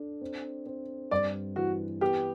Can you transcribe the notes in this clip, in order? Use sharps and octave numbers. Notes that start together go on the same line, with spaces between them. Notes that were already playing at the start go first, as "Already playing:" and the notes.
Already playing: D4 A4
C4
C4
G2 D5
E3 F#4
B3 G4